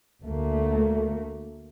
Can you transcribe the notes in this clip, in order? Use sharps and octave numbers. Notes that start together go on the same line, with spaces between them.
D2 A3 A#3